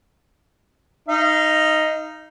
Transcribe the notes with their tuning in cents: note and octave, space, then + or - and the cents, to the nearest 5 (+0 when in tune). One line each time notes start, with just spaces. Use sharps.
D#4 +0 F5 -30